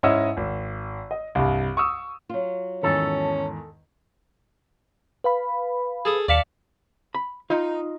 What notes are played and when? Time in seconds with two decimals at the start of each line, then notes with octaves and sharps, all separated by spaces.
0.03 G#2 C#4 E4 D#5 E6
0.37 G#1
1.11 D#5
1.35 C2 G2
1.77 C#6 D#6 E6
2.29 F#3 F4
2.83 E2 G#2 D#3 C#4 A4
5.24 B4 F5 B5
6.05 G#4 A4 D#6
6.28 D#2 D5 F5 A5 B6 C#7
7.15 B5
7.50 D#4 F4